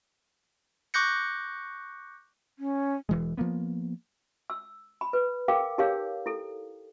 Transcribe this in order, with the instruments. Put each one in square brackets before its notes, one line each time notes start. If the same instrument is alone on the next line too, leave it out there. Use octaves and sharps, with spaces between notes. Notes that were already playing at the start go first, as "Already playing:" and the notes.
[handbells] C#6 D6 F#6 G6 A#6 C#7
[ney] C#4
[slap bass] E1 E3 G#3
F3 A#3 B3
[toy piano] E6
B5
B4
G#4 A#4 F5 G5 D6
D#4 G4 G#4 A#4 C#5 F5
E4 A4